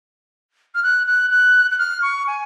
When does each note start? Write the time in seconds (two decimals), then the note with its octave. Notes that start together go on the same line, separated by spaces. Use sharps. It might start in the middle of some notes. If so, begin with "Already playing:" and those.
0.75 F6
0.83 F#6
1.07 F#6
1.30 F#6
1.71 F#6
1.79 F6
2.02 C#6
2.27 G#5